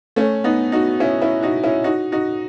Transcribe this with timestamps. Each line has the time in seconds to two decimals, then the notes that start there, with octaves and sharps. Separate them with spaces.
0.16 A3 C#4
0.44 B3 D#4
0.72 D#4 F#4
1.00 C#4 E4
1.22 C#4 E4
1.43 D#4 F#4
1.63 C#4 E4
1.84 D#4 F#4
2.12 D#4 F#4